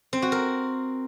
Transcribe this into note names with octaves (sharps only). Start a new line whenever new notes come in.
C4
F#4
A#4